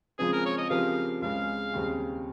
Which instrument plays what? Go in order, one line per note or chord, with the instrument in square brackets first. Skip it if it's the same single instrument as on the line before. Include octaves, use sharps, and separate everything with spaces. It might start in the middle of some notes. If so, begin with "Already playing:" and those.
[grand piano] C#3 F3 G#3 C4 [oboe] G#4
[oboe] A#4
C#5
D#5
[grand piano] C#3 F3 C4 G4 A#4 [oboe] F5
[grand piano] C#2 C#3 G#3 C4 [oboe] F5
[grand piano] D#2 C#3 G3 C4